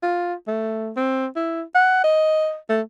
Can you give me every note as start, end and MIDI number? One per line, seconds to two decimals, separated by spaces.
0.03 0.34 65
0.47 0.91 57
0.96 1.27 60
1.36 1.62 64
1.75 2.00 78
2.04 2.56 75
2.70 2.81 57